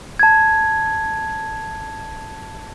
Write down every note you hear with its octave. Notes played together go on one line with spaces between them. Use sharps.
A5 G#6